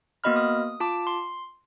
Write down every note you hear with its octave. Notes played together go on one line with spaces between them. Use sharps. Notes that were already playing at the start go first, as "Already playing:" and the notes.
A#3 B3 F#4 D#5 B5 F6
D#6
F4 A5 D6
C6